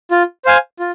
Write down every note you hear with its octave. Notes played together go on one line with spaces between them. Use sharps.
F4
C5 F5 G#5
F4